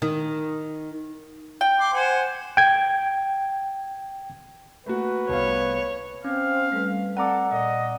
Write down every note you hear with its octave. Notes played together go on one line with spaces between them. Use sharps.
D#3
G5
C6 D6
C5 F#5 G#5
G5 G#6
A3 A#3 F#4 B4
C2 B3 C#5 F5
C4 C#4 F5 G#6
G3 A3 B4
C4 A4 D5 F#5 A#5 D6
A#2 D5 D#5